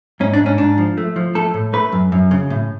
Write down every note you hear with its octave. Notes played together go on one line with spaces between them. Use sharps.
G#2 C#4
D4
G#2
C#4
G#2 D4
F3
A3
F3
A3 A4
A2
A3 B4
F#2
F#2
C#3
A2